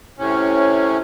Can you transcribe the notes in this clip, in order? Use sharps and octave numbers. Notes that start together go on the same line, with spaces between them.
A2 C3 C#4